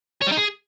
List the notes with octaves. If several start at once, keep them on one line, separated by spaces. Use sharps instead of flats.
C#5
G3
D#4
G#4